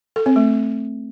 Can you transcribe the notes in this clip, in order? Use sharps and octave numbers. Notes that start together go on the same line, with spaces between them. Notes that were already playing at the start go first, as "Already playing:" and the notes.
A4
C4
A3